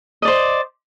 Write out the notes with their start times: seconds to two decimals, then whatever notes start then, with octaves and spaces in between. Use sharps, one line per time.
0.22 D#5
0.25 D5
0.28 C5